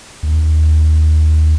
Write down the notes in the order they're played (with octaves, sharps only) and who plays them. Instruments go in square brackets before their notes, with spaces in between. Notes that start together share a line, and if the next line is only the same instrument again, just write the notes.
[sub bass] D#2